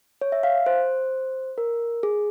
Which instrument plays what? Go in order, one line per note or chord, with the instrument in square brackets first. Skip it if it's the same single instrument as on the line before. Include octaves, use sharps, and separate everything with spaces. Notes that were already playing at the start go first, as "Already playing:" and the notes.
[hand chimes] C#5
E5
F5
C5
A#4
G#4